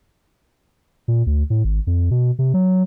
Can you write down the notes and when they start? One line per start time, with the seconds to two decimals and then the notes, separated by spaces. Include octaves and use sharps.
1.08 A#2
1.27 D2
1.50 A2
1.64 G#1
1.87 F2
2.11 B2
2.39 C3
2.54 F#3